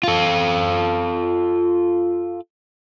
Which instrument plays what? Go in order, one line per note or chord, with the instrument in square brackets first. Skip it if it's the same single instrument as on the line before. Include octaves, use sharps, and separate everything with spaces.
[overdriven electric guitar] F4 A4